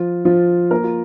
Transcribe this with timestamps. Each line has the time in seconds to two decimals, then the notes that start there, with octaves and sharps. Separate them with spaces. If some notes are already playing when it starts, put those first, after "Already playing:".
Already playing: F3 F4
0.25 F3 F4
0.71 A#3 A#4
0.84 F4